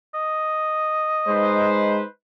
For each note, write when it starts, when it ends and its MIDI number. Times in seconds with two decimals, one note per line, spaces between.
0.15 1.85 75
1.27 2.02 56
1.27 2.05 63
1.27 2.05 71
1.27 2.05 72